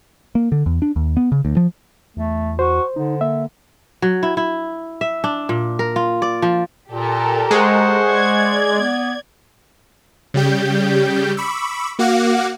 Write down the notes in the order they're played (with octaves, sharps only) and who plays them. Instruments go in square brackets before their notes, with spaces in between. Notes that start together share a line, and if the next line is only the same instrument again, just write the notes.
[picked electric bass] A#3
D3
E2
D4
D#2
B3
C#3
D2
F3
[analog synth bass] E2 [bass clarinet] A3
[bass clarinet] F#4 [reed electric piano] C5
[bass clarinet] D3 [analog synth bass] D#4
[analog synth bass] A#3 [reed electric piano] E5
[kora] F#3
E4
E4
E5
D4
A#2
A#4
F4
D5
F3
[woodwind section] A#2 [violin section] G4 A4 A#4
[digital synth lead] G#3 [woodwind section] C5 F#5 C#6
[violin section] D5 G#6
[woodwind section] B3
[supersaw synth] C#3 G3 G4 G6
B5 C#6 D6 E6
A#3 F#4 F5 F#5 D6